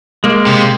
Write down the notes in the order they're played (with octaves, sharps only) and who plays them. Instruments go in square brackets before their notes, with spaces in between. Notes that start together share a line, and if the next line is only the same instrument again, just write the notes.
[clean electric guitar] G#3 A#3
[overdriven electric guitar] C3